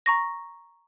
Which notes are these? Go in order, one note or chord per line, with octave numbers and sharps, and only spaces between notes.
A#5 C#6 A#6